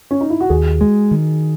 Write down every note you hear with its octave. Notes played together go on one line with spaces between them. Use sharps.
C#4
D#4
E4
F#4
D#2 G#4
G#3
D#3